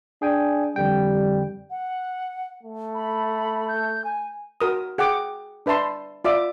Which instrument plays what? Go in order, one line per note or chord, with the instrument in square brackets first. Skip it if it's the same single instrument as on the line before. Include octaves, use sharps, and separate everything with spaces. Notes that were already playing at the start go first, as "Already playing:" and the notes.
[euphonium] D4 [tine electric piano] G#4 G5 G#5
[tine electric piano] F2 D3 G5 [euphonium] G3
[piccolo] F#5
[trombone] A3
[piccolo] B5
G6
G#5
[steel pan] F#4 A#4 D#6
G#4 F#5 G5 D6
D4 B4 E5 A5 C6
F4 D5 E5 D6